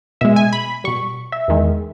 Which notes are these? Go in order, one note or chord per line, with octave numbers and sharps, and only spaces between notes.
B2 G#3 E5
G#5
B5
B2 G3 C#6
E5
E2 D#3 G#3